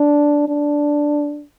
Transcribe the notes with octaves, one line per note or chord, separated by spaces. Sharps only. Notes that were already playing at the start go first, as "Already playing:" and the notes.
Already playing: D4
D4